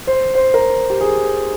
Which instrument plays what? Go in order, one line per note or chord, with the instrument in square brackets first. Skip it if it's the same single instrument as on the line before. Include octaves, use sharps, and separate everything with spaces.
[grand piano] C5
C5
A#4
G4
G#4